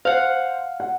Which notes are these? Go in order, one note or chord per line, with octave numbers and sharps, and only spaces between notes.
C5 F5 F#5
F#5